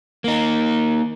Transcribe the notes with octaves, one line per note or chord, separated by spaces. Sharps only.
A#3 D#4